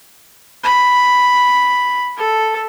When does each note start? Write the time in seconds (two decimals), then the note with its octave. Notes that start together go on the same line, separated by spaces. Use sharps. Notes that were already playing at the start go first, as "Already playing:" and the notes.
0.64 B5
2.17 A4